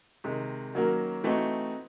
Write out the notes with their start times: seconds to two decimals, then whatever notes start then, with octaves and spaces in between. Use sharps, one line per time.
0.24 C3 D#3 G#3
0.74 D#3 F#3 A#3 C#4 F#4
1.24 E3 A3 C4 D#4 F#4